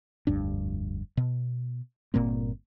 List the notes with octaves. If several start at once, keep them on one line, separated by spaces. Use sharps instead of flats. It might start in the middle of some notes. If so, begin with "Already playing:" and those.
F1 D2 G2 D4
B2
G1 A#2 A#3 C4